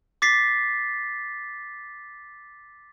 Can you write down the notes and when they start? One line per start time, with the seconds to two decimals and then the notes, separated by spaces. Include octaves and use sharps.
0.22 D6 A6 B6 C7